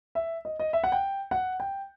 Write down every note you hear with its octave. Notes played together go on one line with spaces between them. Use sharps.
E5
D#5
D#5
E5
F#5
G5
F#5
G5